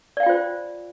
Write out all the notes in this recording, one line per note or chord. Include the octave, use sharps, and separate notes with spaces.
F4 C5 D5 F5 G5